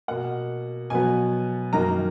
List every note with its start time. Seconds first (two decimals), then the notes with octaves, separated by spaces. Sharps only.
0.08 B2 A#3 F#5
0.90 B2 F#3 B3 G#5
1.73 F#2 D#3 A#3 A#5